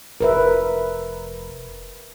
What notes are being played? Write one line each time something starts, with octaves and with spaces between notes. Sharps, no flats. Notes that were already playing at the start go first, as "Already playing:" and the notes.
F1 A#4 B4 E5